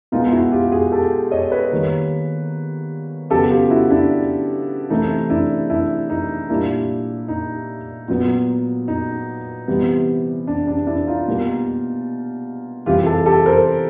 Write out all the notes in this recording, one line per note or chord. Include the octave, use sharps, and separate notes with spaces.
B2 G#3 B3 D#4 F4
E4 F#4
F4 G4
F#4 G#4
G4 A4
C#5 D#5
B4 C#5
D#3 G3 A#3
C#3 F#3 B3 G4 A4
F4 G4
E4 F#4
D4 E4
C3 E3 A3 D#4
D4 E4
D4 E4
D#4
A#2 G3 A#3 D4 E4
D#4
A#2 F#3 B3
D#4
C3 E3 G3 B3
D4
D4
D4 E4
D#4 F4
B2 G3 A#3
C3 E3 G3 F4 G4
G4 A4
G4 A4
A#4 C5